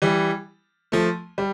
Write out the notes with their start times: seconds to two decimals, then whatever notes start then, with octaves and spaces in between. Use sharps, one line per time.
0.02 E3 G3
0.92 F3 A3
1.38 G3